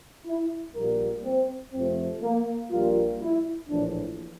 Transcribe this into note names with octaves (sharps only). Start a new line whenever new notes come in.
E4
A#1 A#2 G3 A#3 A#4
C4
F2 C3 F3 A3 C4
A#3
A#1 A#2 G3 A#3 F4
E4
A#1 A2 E3 D4